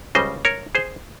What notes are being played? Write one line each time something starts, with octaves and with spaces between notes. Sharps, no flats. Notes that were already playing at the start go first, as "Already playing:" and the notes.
C#2 C#3 G3 C5 D#5
A#4 C#5
G#4 C5